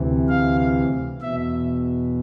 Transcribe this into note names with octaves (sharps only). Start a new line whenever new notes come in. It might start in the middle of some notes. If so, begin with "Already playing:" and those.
Already playing: D2 C3 E3
F5
E2 B2 E5